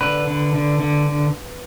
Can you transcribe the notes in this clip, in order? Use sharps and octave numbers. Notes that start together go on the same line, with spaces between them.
D3 B4
D3
D3
D3